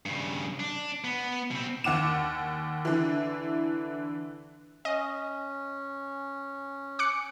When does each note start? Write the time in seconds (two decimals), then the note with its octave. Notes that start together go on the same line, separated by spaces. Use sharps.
0.06 G2 C#3
0.60 D4
1.04 B3
1.51 B2 C4
1.84 D#2 F#5 D6 E7
2.85 D3 E3
4.85 C#4 D#5
6.99 D6 F#6 C#7